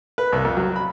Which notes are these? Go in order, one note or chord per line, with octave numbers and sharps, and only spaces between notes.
B4
C2
F2
F#3
B5